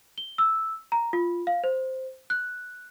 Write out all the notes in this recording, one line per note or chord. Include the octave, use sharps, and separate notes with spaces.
G7
E6
A#5
F4
F5
C5
F#6